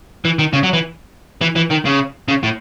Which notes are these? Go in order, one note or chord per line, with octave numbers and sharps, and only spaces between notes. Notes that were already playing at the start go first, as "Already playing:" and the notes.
E3
D#3
C#3
F#3
E3
E3
E3
D#3
C#3
C#3
A2